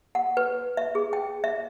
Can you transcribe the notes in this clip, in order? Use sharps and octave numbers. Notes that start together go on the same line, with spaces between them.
F#5
B4
E5
G#4
G5
E5